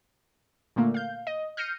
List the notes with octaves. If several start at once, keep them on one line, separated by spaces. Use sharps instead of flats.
A#2 D3 A3 A#3
F5 G6
D#5
F6 G6 A#6 C7 C#7 D#7